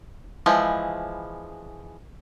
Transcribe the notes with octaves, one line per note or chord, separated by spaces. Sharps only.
E3 F3 G#3 E4